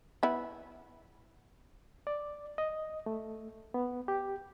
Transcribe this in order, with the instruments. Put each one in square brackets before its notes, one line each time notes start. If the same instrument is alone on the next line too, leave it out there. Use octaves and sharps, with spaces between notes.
[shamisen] B3 E4
[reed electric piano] D5
D#5
A3
B3
G4